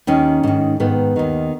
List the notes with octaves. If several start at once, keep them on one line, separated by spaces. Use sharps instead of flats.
D#2 D#3 C#4
G#2 D#3
G#2 D#3 B3
D#2 D#3